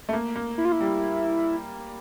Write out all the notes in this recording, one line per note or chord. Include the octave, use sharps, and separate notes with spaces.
A3
A#3
A#3
E4
F4
E4
G3